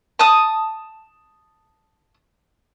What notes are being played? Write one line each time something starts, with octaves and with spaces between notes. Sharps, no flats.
A5 D#6